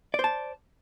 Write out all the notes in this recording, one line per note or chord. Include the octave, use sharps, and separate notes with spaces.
C5 D5 A5